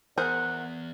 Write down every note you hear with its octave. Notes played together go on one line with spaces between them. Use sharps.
E2 G#4 A#4 C5 F#5